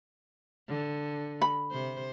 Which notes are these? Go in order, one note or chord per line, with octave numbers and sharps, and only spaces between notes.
D3
B5
C3 C5